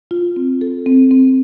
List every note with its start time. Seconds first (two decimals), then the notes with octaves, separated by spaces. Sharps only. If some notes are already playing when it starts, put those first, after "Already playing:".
0.11 F4
0.36 C4
0.61 A4
0.86 C4
1.11 C4